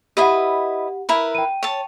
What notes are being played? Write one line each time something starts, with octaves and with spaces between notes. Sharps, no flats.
E4 G4 B4 D#5 F#5
E4 A#4 B4
G5 D#7
C#5 A5